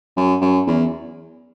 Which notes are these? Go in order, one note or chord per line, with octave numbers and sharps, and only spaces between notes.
F#2
F#2
E2